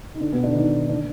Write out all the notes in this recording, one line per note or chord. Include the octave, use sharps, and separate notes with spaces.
D#4
D3 D4
B2 B3
D3 D4
D#3 D#4
D3 D4